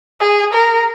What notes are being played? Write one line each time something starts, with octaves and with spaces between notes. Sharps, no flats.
G#4
A#4